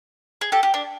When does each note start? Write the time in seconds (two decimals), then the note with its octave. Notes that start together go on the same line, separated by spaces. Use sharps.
0.41 G#4
0.52 G4 A4
0.63 G4
0.74 D4